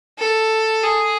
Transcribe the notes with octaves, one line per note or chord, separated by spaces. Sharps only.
A4
G#4